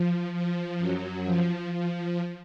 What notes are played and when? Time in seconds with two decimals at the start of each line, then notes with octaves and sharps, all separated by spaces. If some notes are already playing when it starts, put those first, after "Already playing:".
Already playing: F3
0.33 F3
0.80 F#2 F#3
1.26 F3
1.72 F3